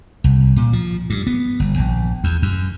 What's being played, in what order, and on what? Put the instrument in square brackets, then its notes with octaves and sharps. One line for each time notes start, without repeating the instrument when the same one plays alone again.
[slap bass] C2
A#2
F3
G2
B3
G1
A#1
E2
F#2